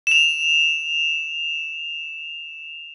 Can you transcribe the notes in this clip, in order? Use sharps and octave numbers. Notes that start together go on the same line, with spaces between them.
E7 F7